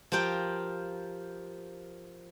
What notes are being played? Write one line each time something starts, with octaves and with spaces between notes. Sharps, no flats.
F3 F4 G4 A#4 G5